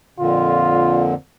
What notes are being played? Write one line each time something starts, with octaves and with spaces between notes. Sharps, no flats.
F2 A#2 D3 F4